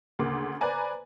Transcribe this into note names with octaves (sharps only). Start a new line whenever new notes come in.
D2 C#3 A#3 C6 D6
B4 C5 D5 G#5 A#5